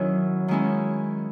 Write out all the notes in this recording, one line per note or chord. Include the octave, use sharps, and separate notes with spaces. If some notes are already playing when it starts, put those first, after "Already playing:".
Already playing: D#3 F#3 C#4 E4
D#3 G#3 C#4 E4